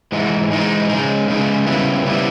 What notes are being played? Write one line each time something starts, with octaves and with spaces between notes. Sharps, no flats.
G#2 E3 G#3 D#4
G#2 E3 G#3 D#4
C#3 G#3 D#4
C#3 G#3 D#4
C#3 G3 B3 E4
C#3 G3 B3 E4